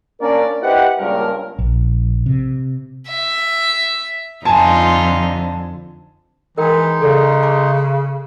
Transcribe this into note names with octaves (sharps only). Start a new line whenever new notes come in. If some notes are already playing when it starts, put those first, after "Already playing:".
A#3 C#4 D4 A#4 D5
E4 G4 B4 C5 D#5 F#5
C#2 G2 A#2 A#4
A#1
C3
E5
F2 D3 D#4 F4 G#5 A5
E3 G#3 D#4 A#4 D#5 G5
C#3 A4 D5
A5 C6 D6